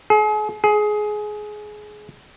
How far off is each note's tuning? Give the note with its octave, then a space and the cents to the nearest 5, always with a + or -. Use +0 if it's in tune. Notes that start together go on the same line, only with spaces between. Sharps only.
G#4 +40
G#4 +20